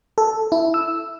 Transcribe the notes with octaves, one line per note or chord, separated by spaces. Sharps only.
A4
E4
E6